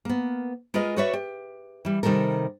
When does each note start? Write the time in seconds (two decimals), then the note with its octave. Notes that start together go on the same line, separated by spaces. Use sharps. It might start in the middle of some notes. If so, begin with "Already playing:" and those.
0.05 A#3 B3
0.74 G#3 F4 A#4 B4 D#5
0.97 F#4 B4 C#5 D5 E5
1.13 G4
1.85 E3 G3
2.03 C3 D#3 G3 A4 A#4